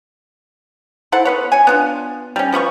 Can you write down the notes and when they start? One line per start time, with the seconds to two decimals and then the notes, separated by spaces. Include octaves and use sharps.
1.12 E4 A4 C5 F#5
1.25 B3 B4 C#5
1.52 C#5 G#5
1.67 B3 D4 F4
2.36 G3 C#4
2.52 F3 B3 B5 C#6